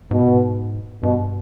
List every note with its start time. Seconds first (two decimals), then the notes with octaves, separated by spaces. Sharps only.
0.11 G#2 B2
0.19 A#2
0.28 G#2
1.03 G2 B2